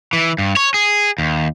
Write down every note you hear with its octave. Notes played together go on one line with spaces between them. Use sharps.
E3
G2
C#5
G#4
D#2